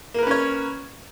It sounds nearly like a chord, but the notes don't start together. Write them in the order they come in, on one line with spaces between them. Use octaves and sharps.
A#3 A#4 B4 C#4 C#5